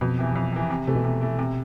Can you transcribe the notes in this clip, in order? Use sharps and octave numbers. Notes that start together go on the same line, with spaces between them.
F2 B2
C3 E3
F2
C3 E3
C3
C3 E3 A3
B2
C3
E3 A3
C3